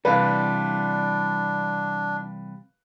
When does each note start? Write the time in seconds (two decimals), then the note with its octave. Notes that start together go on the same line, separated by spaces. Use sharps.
0.05 C3 E3 G3 D4 B4 F5